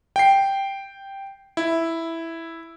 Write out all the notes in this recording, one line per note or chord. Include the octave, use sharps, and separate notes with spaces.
G5 C7
E4